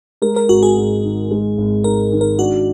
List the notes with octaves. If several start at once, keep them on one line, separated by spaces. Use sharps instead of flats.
G#3 A#4
A#4
G#1 F#4
G#4
G#2
D#3
G#3
G#1
G#2 A#4
D#3
A#4
D4 F#4